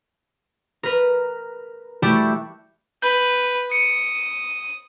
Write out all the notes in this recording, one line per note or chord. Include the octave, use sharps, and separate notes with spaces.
A#4 B4
G3 A3 E4 F#4 G4
B4 G6
D#6 C#7